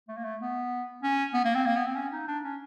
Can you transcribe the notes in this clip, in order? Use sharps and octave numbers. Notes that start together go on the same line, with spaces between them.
A3
A#3
A3
B3
C#4
B3
A#3
C4
A#3
B3
C4
C#4
D#4
D4
C#4